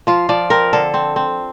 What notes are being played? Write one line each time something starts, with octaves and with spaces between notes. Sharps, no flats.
F3 F4
F3 D5
C4 A#4
D3 A4
C4
C4